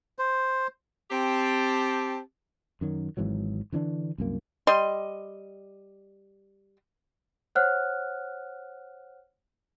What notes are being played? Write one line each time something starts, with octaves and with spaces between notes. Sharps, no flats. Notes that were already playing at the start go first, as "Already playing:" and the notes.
C5
C4 G4 A5
F#2 D#3 F#3
G#1 G#2 E3 F#3
D3 E3 C#4 D4
C2 F#2 A#3
G3 D#5 C6
C5 C#5 F#5 F6 F#6